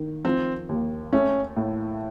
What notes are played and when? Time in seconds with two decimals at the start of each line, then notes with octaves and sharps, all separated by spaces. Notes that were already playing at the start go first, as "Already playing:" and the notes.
Already playing: D#3
0.25 F3 C4
0.69 D#2
1.12 A3 C#4
1.56 A2